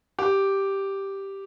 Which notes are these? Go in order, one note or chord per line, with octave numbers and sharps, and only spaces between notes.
G4